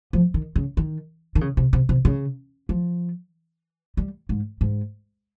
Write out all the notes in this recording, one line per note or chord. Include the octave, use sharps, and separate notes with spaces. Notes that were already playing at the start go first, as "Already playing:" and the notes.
F3
D#3
C#3
D#3
D#3
C#3
C3
C3
C3
C#3
F3
G3
G#2
G#2